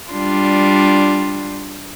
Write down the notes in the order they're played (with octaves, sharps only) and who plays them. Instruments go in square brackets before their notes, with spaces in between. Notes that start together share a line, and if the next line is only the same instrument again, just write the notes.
[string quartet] G3 D4 F4